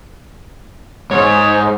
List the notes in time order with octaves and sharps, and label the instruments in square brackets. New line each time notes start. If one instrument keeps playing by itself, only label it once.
[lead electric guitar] G#2 [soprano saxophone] C#5